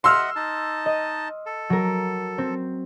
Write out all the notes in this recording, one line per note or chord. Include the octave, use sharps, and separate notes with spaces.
D#5 E5 F#5 C6 E6 F6
D#4 A5
D#5
A4
F#3 A#4
C4